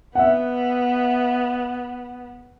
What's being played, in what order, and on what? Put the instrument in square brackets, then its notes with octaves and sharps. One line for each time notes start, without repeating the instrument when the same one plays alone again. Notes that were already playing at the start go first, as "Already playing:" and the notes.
[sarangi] B3 [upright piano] E5 F#5